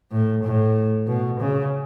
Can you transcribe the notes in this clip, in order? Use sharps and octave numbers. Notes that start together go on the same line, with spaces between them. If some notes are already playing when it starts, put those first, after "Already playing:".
A2
A2
B2
C#3